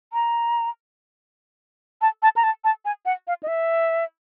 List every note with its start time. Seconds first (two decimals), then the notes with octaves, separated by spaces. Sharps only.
0.13 A#5
2.02 A5
2.23 A5
2.36 A#5
2.43 A5
2.64 A5
2.85 G#5
3.06 F#5
3.27 F5
3.43 D#5
3.48 E5